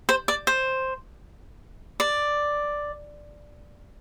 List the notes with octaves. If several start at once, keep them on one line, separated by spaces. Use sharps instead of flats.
C5
D5
C5
D5